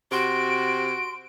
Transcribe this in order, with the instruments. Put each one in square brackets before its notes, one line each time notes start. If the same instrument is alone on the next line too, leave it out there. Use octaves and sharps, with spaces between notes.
[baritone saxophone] C3 [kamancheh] F#4 [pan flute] C6 [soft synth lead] D7